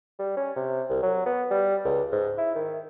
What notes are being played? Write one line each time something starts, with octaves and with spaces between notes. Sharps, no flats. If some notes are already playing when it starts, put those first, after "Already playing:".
G3
C#4
C3
C2
F#3
B3
G3
C#2
G#2
E4
D#3